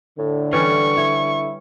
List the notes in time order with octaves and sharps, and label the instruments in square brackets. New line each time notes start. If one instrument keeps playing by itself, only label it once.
[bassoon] A2 [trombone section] D3
[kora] E3 G3 C#4 [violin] C#6
[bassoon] E4 [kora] C#5